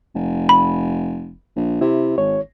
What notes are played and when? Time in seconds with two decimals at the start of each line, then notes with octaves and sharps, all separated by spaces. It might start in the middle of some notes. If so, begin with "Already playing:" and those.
0.15 F1
0.49 B5
1.56 A#1
1.81 C3 E4
2.18 G#1 C#5